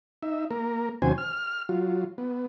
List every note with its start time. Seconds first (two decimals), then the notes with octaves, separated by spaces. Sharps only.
0.23 D#4 E5
0.51 A#3 A#4
1.02 D#2 C3 F#3 C#4 C5 G#5
1.18 F6
1.69 F#3 F4
2.18 B3